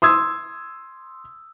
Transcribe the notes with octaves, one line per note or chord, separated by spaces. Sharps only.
C6 D#6 E6 G#6